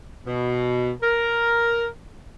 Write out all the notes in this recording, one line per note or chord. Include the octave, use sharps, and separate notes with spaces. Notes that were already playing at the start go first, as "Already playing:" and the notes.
B2
A#4